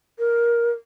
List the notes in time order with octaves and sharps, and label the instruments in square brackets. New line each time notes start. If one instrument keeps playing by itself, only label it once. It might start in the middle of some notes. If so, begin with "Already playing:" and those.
[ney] A#4